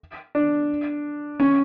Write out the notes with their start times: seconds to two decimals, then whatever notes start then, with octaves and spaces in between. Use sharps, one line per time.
0.35 D4
1.40 C#4